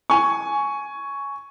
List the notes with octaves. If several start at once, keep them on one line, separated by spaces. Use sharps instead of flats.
G#5 C#6